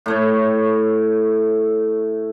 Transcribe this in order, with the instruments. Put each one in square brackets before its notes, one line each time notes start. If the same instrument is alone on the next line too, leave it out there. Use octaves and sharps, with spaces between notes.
[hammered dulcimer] A2 A3 C#5